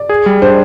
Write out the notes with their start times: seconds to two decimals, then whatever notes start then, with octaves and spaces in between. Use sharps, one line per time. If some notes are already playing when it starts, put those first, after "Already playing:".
Already playing: D5
0.09 G#4
0.26 G3
0.42 D4 C5